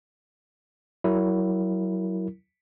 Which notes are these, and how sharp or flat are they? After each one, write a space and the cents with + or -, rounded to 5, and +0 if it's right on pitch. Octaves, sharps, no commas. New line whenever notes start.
F#3 +20 E4 +0 A#4 -10